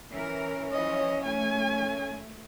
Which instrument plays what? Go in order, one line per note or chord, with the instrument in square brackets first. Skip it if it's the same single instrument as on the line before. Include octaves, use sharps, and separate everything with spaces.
[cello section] E3 A#4 [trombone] C#4
[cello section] E3 F3 [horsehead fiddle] C#5 D#5
[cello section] A3 [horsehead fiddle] G#5